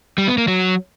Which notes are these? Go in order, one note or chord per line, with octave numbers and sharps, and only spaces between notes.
G3
B3
A#3
F#3